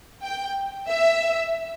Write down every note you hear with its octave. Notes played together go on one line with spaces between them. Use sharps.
G5
E5